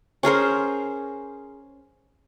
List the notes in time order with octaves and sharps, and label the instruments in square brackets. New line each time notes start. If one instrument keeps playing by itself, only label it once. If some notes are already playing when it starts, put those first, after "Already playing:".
[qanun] C#4 G#4 A#4 C5